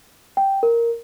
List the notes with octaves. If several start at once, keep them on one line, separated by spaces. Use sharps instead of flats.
G5
A#4